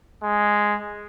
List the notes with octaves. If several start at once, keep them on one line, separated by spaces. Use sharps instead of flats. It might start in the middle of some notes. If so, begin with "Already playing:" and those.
G#3